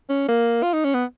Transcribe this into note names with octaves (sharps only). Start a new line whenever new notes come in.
C#4
A#3
F4
D#4
C#4
B3